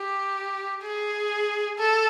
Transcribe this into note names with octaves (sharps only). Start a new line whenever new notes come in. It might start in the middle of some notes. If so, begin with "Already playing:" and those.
Already playing: G4
G#4
A4